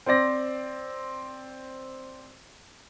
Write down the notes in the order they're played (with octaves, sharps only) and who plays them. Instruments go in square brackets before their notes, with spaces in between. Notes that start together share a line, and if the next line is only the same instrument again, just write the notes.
[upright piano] C4 C5 D5 A#6